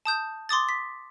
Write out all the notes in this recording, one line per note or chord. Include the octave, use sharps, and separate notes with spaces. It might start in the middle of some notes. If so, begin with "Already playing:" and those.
A5 D#6 G6
C6 D6 D#6 A6
B6